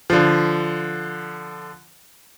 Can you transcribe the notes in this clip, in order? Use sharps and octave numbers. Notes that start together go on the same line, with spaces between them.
D3 F3